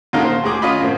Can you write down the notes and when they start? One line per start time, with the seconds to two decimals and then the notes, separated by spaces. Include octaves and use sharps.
0.13 A#2 D3 C#4 D#4 F5 A#5
0.25 C5
0.44 D2 G#3 G#4 D6
0.62 C#4 F4 D#5 B5
0.80 F#2 A2 C4